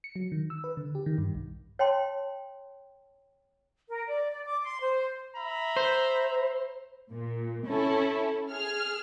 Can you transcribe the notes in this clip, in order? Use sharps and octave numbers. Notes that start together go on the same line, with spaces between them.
C#7
F#3
D#3
E6
B4
D3
G4
D#3
G2
B1
C#5 G5 A5 C6
A#4
D5
D5
D6
C6
C5
E5 A#5 B5
C5
A#2
C#4 E4 A4
G#4 F6